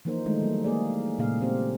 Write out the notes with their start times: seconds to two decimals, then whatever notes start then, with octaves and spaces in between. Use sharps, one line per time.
0.05 E3 F3 A#3 D#4 A#4 C5
0.26 D#3 G#3 A3 D4 D#4
0.42 F#3 G3 A#3
0.64 A#3 G#4 D5
1.18 A#2 C#3 A3 A#3 G#4 F5
1.41 A3 C4 G4 C5